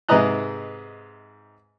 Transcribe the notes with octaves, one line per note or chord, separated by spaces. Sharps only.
G#2 C3 B4 D#5 A#5 F#6